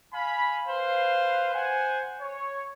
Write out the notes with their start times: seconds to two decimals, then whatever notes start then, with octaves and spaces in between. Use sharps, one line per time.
0.13 F5 G#5 B5
0.67 B4 C5 F5
1.53 C5 F#5 G#5
2.20 C#5